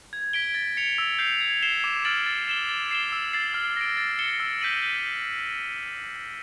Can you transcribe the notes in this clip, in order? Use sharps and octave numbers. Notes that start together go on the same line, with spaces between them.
G#6
B6 D7 G7
A6
C#7 F7
E6
G6 C7 F7
G#6
C7 E7 G7
D6
F6 A6 D7 F#7
A6
C7 E7 G7
A6
C7 E7 G7
E6
A6 C7
F6
A#6 D7
A6
C#7 E7 G7
E6
G6 B6 D#7 F#7
G6